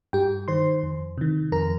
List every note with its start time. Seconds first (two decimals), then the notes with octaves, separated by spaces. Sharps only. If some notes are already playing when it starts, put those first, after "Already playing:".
0.13 G2 G4 G5
0.48 D#3 C5 C6
0.83 F2
1.18 C3 D#3
1.52 F2 A#4 A#5